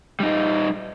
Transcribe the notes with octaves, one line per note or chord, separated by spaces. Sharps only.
G3 D#4